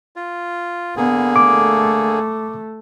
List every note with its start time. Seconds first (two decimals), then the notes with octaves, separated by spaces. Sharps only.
0.16 F4
0.97 D3 A#3 B3 G#4
1.36 A3 D6